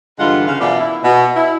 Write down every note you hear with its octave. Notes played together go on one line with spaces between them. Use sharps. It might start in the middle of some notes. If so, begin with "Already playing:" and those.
G2 D3 E3 G#3 F4 F#5
C#3 F5
F#2 B2 E3 F4 D5
E4
B2
E4